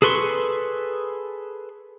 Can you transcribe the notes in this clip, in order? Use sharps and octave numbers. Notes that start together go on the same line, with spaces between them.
G#4 A4 B4 C6 C#6